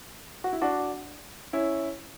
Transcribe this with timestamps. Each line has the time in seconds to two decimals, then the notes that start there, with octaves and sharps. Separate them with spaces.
0.44 F#4
0.53 E4
0.62 D4 F#4
1.53 C#4 E4